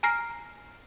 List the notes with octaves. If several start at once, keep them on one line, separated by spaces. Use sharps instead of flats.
G#5 A#5 F6 A#6 C7